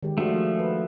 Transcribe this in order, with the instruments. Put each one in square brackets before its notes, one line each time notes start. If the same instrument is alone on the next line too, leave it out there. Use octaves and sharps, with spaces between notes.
[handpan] D#3 G#3 G4
[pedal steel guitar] F3 A3 [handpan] D4 F#4 G#4
[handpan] B4